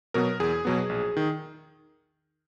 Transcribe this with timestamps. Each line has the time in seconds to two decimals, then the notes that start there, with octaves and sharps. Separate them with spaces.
0.14 B2 F#3 B3 A#4
0.40 E2 G#4
0.65 B2 F#3 B3
0.89 A#1
1.17 D#3